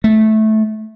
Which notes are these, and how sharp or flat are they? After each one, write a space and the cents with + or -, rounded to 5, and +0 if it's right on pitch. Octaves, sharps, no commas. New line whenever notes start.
A3 -15